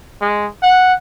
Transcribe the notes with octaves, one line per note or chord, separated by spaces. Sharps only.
G#3
F#5